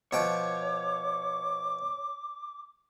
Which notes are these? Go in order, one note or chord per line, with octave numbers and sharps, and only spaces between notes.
B2 F3 C#5 G5 D6